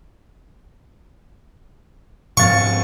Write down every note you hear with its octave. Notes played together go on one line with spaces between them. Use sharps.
G#2 F3 C4 F5 C#6 A6